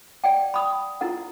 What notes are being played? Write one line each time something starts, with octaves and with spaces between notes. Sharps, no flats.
D5 F#5 G5
B5 D#6
E4 F4 A#4 F#5